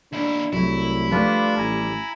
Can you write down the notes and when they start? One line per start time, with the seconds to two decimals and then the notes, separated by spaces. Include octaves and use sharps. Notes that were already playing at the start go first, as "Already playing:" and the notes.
0.13 D#2 D4 E4
0.53 C2 F#3 A3 E4
1.11 F3 G3 A3 D4 F4 B4
1.58 A1 G#5 A#5